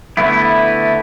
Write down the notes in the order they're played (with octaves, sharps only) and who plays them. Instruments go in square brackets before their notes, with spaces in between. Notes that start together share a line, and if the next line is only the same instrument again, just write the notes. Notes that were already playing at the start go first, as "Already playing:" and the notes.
[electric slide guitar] D3 A3 B3 E4